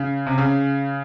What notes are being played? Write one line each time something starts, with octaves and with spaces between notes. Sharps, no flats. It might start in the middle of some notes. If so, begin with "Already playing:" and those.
Already playing: C#3
C3
C#3